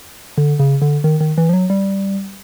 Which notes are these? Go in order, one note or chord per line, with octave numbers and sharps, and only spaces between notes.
D3
C#3
D3
D#3
D#3
E3
F3
F#3
G3